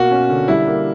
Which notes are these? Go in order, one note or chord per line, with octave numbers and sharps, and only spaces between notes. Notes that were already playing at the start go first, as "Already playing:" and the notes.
Already playing: B2 A#3 F#4
C#4
D3
G3 E4
A#3